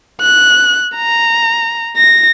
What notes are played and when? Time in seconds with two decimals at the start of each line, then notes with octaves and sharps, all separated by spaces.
0.21 F#6
0.96 A#5
1.97 A#6